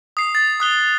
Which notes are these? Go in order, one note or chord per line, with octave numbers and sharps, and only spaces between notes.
D#6 C7
A6
D#6 F#6 G7